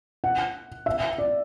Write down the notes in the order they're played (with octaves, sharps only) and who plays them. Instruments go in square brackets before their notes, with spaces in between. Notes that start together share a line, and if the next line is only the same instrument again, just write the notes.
[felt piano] F#5
E5
D5